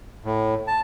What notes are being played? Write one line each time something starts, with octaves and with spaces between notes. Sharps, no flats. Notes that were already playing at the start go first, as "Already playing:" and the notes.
A2
A5